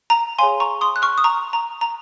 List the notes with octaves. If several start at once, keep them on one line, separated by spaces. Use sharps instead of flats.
A#5
G#4 C#5 F5 G#5 C6
A#5 C#6
C6 D#6
F#6
C#6 F6
D#6
A#5 C#6
A#5
A#5